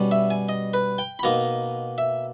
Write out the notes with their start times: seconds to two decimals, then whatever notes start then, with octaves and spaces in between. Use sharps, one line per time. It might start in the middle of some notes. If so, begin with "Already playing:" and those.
Already playing: B2 G3 C#4
0.11 E5
0.30 G#5
0.49 D#5
0.74 B4
0.98 G5
1.19 B5
1.23 B2 A#3 D#4 A#5
1.98 E5